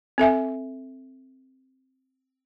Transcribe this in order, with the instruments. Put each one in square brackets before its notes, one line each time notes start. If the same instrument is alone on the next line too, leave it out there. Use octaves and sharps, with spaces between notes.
[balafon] C4 A4 E5 G#5